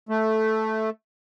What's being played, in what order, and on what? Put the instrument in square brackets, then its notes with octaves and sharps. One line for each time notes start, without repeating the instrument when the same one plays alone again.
[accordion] A3